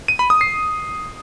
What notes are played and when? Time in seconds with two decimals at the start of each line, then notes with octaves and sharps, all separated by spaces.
0.08 D#7
0.19 B5
0.30 D#6
0.41 C7